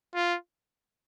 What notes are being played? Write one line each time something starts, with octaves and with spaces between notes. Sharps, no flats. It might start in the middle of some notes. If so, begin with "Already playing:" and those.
F4